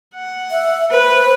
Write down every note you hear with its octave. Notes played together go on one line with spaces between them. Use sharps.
F#5
E5
B4 C5